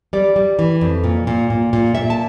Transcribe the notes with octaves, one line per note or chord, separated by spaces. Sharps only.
G3 D5
G3
E3
F2
A#2
A#2
A#2
A#2
A#2 E5
A5